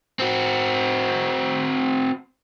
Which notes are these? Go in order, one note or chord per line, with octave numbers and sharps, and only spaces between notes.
C4 F#4